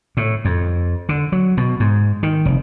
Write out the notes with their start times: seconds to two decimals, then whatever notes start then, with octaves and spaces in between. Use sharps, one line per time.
0.17 A2
0.45 F2
1.09 D3
1.32 F#3
1.57 B2
1.80 G#2
2.23 D#3
2.45 F1